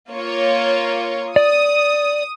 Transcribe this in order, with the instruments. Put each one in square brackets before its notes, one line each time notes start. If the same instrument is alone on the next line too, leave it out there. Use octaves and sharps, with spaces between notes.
[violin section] A#3 F4 C#5
[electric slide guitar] D5 [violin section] D#6